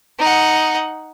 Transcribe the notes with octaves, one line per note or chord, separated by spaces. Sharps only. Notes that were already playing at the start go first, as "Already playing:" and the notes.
D#4 F#5